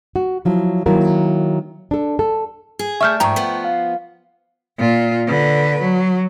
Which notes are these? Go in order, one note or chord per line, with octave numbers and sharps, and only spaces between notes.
F#4
F3 F#3 E4
D#3 F#3 A#3 E4 A#4
D4 A4
A4
G#4
A3 D5 E5 C#6 F6 G6
G#2 F3 G5 A#5 C#6
F3 B3
F5
A#2 F4
D3 B4
F#3